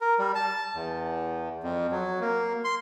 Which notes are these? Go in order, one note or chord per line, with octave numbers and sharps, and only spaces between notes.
A#4
G3
A5
E2
F2
F#3
A#3
C6